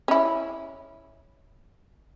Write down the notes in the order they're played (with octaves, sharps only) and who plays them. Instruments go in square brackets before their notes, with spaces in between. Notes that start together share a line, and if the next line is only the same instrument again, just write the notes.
[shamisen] C#4 E4